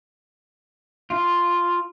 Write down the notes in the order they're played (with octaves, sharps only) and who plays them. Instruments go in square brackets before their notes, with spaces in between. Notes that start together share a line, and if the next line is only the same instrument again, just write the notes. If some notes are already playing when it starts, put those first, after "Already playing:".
[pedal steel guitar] F4